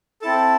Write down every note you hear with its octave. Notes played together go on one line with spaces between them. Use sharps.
C4 E4 A4 A5